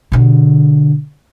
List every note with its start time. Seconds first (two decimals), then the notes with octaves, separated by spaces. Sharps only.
0.12 B2 D3